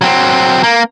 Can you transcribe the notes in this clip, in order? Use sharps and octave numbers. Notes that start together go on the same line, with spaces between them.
F#3 C4
A#3